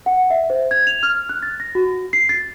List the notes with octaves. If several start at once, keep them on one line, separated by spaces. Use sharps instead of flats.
F#5
E5
C5
G#6
F7
F6
F#6
A6
A#6
F#4
C7
A6